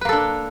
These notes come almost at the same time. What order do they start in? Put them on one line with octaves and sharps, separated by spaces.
B4 A#3 A4 D4